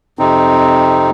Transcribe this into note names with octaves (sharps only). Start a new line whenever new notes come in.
F2 C3 C4 D#4